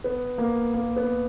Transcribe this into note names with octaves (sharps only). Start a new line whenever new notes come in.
B3
A#3
A#3
B3